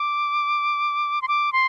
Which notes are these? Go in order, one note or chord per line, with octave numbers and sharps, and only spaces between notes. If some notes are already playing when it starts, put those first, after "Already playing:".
Already playing: D6
C6
D6
C6